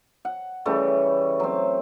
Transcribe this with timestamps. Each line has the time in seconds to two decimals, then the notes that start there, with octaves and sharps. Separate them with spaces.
0.25 F#5
0.66 C#3 E3 G3 A3
1.40 F#3 C4